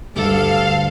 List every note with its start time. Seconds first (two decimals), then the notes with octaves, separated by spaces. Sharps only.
0.15 D2 G2 G3 A3 A4 F5